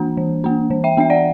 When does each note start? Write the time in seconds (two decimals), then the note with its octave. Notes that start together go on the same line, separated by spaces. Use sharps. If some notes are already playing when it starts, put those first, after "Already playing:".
Already playing: E3 A#3 D4
0.17 E3
0.44 A#3 D4
0.70 E3
0.84 E5 G5
0.97 B3 D4 E5
1.10 D5 F#5